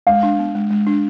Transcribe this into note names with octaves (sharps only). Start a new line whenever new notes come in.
G#3 F5
D4
B3
G#3
G#3
D4